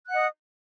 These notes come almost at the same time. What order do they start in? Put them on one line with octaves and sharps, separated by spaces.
F#6 F#5 D#5 D#6